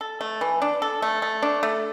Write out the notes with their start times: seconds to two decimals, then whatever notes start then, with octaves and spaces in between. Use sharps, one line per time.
0.01 A4
0.21 A3
0.41 E3
0.62 D4
0.82 A4
1.02 A3
1.22 A3
1.42 D4
1.63 A3